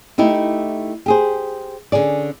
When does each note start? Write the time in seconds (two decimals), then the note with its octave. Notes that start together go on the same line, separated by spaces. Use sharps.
0.18 A3 D#4 E4 G4
1.06 G4 G#4 C5
1.92 D3 C#4 G#4 D5